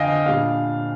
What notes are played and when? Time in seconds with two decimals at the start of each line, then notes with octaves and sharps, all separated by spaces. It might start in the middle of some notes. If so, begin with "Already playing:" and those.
Already playing: F2 D3 D#5 F5 G5 G#5
0.26 A#2 G3 D4 F5